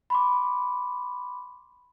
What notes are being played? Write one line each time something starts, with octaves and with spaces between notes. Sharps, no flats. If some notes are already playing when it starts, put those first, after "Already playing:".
B5 C6 D6